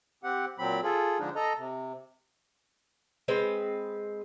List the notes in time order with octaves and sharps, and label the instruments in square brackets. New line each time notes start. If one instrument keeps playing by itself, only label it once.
[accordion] C4 G4 F#5
A#2 F#3 C4 B5
F4 G#4 A4
D3 F3 G#3 D4 D#4
A4 D#5 A#5
C3
[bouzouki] G#3 C4 B4